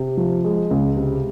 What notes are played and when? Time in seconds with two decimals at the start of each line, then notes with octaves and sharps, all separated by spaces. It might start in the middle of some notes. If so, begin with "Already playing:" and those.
Already playing: C3
0.17 F3
0.44 G#3
0.71 C#2
0.96 C3